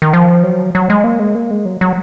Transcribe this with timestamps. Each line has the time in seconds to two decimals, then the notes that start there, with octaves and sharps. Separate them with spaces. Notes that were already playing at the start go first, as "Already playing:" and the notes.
0.02 D#3
0.13 F3
0.43 F#3
0.75 F#3
0.90 G#3
1.04 A#3
1.19 G#3
1.35 A#3
1.51 G#3
1.65 F#3
1.81 F#3